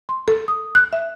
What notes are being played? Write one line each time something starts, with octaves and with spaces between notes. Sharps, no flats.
C6
A4
D#6
F#6
E5